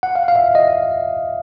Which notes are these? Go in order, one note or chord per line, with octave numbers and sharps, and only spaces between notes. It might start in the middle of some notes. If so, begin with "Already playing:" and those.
F#5
F5
F5
E5
D#5